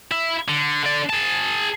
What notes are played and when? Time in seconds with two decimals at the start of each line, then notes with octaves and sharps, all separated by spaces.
0.12 E4
0.48 D3
0.84 D3 D5
1.10 G#4 A5